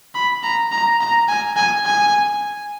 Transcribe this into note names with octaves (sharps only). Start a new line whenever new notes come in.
B5
A#5
A#5
A#5
G#5
G#5
G#5